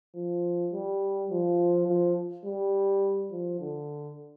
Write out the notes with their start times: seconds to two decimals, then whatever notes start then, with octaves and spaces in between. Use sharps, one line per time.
0.15 F3
0.73 G3
1.30 F3
1.87 F3
2.45 G3
3.31 F3
3.60 D3